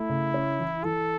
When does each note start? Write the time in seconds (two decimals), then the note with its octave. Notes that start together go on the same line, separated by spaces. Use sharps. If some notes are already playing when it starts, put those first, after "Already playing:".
Already playing: A3 E4
0.09 C#3
0.34 C#4
0.59 E3
0.84 E3 A4